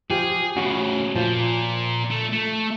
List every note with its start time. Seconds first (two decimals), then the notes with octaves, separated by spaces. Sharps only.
0.10 F3 G4 G#4
0.57 A2 C#3 C#4 F#4
1.16 A#2 F3
2.11 A3
2.33 A3